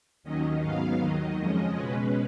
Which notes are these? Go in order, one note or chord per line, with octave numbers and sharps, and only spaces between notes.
D#2 D#3 F#3 C#4 D#5
G#2 F#3 B3 F5
D#2 D#3 F#3 D#5
F2 C#3 F3 G#3 C#4
B2 G#3 C#4 B4